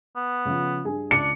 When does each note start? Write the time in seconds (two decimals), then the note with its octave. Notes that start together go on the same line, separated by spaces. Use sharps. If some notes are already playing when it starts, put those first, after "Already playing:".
0.16 B3
0.45 C#3 F3
0.85 G2 G#4 G#5
1.11 C#2 D4 C#7